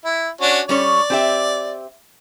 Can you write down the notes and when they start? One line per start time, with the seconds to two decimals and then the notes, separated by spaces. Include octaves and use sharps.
0.05 E4
0.41 C#4 D4 F#4
0.69 G3 C#4 C#5 D5
1.10 C4 G4 E5